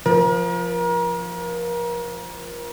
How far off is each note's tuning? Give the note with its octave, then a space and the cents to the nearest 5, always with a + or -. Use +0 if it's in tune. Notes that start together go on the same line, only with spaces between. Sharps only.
F3 +0 A#4 +30